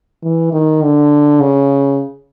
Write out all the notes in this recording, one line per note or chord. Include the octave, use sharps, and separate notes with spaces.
E3
D#3
D3
C#3